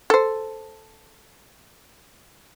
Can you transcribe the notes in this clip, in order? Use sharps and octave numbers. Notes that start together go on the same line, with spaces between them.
A4 C5